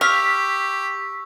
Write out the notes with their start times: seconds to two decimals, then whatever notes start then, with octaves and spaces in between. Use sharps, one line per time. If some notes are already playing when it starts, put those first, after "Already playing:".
0.01 G4 F5 C#6 E6 B6